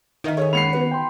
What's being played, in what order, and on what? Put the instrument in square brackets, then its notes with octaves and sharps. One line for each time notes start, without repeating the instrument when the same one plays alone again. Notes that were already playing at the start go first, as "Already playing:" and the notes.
[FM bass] D#3 [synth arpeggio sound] A#4 D#5 E5
[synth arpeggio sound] G#4 A4 G#5 [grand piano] C#5
[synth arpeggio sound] G#3 A#3 C#4 [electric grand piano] F#5 B5 [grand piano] C7 C#7 F7
[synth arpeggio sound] B3 F#4 B4
[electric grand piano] G5 B5 C6